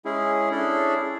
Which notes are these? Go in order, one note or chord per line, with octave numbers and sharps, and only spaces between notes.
G#3 C#4 E4 G#4
C#4 D4 E4 G#4 A4